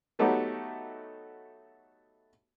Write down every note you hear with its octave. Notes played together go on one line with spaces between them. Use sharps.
F#3 A3 B3 D#4 F#4 G4